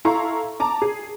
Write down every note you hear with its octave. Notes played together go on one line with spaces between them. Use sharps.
E4 A4 F5 A#5 C6 C#6
A5 A#5 D6
G#4